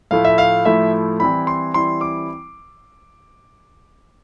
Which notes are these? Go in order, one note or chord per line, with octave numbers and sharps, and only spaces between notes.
A2 F3 A3 E4 F5
E5
F5
A2 F3 A3 E4 E5
E3 G3 C4 E4 B5
C6
E3 G3 C4 E4 C6
D6